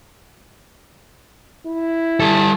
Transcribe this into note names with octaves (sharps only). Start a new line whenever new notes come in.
E4
G3 A4